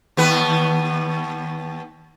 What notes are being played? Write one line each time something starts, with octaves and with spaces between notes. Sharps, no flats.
D#2 B3 B4